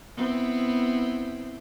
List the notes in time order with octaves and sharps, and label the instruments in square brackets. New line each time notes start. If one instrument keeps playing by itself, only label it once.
[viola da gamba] B3 C4 E4